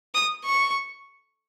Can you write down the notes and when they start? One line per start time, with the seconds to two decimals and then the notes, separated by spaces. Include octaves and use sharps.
0.14 D#6
0.45 C#6